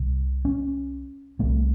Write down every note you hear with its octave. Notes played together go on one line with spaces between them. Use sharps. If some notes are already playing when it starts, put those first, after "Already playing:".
Already playing: C2 C3
C#4
C2 C3 A3